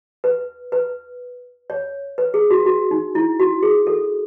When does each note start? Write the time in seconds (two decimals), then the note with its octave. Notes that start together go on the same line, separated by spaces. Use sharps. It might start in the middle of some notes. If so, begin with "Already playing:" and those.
0.24 B4
0.72 B4
1.70 C#5
2.18 B4
2.34 G#4
2.51 F#4
2.66 F#4
2.91 D#4
3.15 E4
3.39 F#4
3.63 G#4
3.87 A4